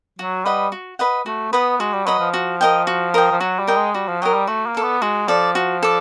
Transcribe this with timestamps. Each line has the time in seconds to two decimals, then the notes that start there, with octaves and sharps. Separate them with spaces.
0.19 F#3 F#4
0.45 G3 B4 D#5 F#5
0.72 F#4
0.99 B4 D#5 F#5
1.26 A3 F#4
1.52 B3 B4 D#5 F#5
1.80 G#3 F#4
1.93 G3
2.06 F#3 B4 D#5 F#5
2.19 F3
2.34 F#4
2.61 A#4 D#5 G5
2.87 F#4
3.14 A#4 D#5 G5
3.31 F3
3.40 F#3 F#4
3.59 G3
3.67 A#4 D#5 G5
3.76 G#3
3.94 G3 F#4
4.08 F3
4.22 F#3 A#4 D#5 G5
4.34 G3
4.47 A3 F#4
4.66 A#3
4.75 A4 D5
4.83 B3
5.02 G#3 F#4
5.28 F3 A4 D5
5.55 F#4
5.83 A4 D5